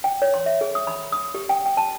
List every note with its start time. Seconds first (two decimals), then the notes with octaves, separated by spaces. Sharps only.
0.04 G5
0.22 C#5
0.34 C6
0.46 E5
0.61 G#4
0.75 D#6
0.87 B5
1.12 D#6
1.35 G4
1.49 G5
1.66 G5
1.77 A5